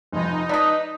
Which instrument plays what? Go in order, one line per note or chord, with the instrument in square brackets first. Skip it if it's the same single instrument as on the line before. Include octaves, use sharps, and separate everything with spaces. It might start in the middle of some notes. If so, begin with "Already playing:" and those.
[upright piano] F1 F2 [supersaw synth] D#4
[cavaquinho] B4 D#5 [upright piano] D5 A5 D#6